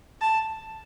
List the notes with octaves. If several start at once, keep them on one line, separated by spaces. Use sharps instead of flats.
A5